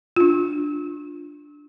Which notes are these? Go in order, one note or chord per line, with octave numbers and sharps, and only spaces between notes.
D4 F4